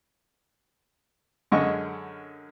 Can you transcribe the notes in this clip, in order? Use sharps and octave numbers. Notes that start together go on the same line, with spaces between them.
F#2 D3 G#3 C#4 D#5 C#6